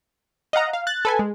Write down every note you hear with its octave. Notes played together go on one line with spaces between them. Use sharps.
D#5 F5 F#5 A#5
F5
F#6 A6
A4 B4 G#5
G#3